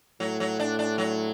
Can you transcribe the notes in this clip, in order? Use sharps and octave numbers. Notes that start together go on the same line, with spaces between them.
A2 F#3
F#3
D4
D4
F#3